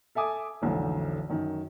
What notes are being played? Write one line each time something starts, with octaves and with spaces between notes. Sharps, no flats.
A4 E5 G#5 D6 D#6
F1 B1 D3 E3
F#2 D#3